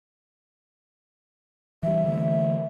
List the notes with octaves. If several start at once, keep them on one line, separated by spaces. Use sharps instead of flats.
E3 G3 E5
D3 E3 A3